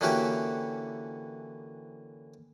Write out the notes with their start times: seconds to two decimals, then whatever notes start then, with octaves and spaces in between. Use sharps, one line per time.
0.01 D3 E3 A#3 C#4 F#4 G4